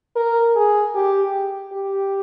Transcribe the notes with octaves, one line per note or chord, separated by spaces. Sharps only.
A#4
G#4
G4
G4